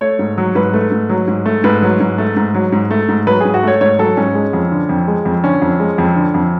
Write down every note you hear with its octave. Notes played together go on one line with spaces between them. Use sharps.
A3 C#5
G#2
F#3
G#2 B4
A3
G#2
F#3
G#2
A3
G#2 B4
F#3
G#2
A3
G#2
F#3
G#2
A3
G#2
F#3 B4
G#2 G#4
F#4
A3 C#5
G#2 C#5
F#3 A4
G#2 C#4
G#3
F2
D3
F2
G#3
F2
D3 C#4
F2
G#3
F2
D3
F2